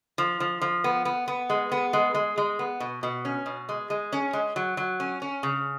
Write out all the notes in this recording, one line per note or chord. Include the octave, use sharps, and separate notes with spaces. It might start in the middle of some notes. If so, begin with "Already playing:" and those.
F3
F3
F3
B3
B3
B3
G#3
B3
G#3
G#3
G#3
B3
B2
B2
C#4
B2
G#3
G#3
C#4
G#3
F#3
F#3
C#4
C#4
C#3